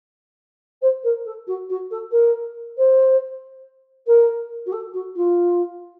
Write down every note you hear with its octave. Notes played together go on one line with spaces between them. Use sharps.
C5
A#4
A4
F#4
F#4
A4
A#4
C5
A#4
F#4
A4
F#4
F4